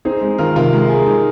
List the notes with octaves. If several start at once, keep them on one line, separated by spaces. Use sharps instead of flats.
C4 D#4 G#4
G#3
D#3 F4 A#4
C3 F4 A#4
G#3
G#4
D#4